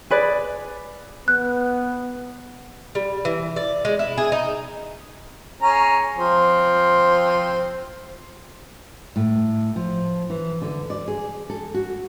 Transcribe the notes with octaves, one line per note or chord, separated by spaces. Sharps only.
G#4 B4 D5
B3 F#6
G3
E3
D5
G#3
E4
G#4
D#4
C#4 G#4 A#5
F3 C4
A2
F3
E3
D3
D5
G#4
A4
F#4